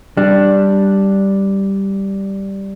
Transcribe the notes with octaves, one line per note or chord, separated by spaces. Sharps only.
G3 D4